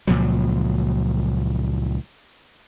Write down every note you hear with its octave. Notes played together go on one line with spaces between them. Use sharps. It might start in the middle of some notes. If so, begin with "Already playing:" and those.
C#2 A#2 F3 F#3